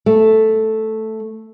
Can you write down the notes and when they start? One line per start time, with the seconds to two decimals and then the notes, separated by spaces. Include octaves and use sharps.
0.06 A3